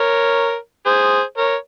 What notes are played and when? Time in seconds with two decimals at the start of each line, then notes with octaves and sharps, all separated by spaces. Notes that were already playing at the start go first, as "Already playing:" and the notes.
Already playing: A#4 C#5
0.86 G#4 C5
1.38 A#4 C#5